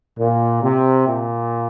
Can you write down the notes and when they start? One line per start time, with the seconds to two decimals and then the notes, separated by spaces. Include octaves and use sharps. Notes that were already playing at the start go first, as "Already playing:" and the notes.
0.18 A#2
0.62 C3
1.06 A#2